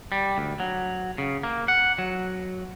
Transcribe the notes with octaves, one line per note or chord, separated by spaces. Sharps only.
G3
D2
F#3
C#3
A#3
F#5
F#3